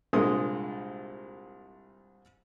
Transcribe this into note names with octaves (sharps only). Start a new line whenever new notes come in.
C2 G2 A#2 G#3 D#6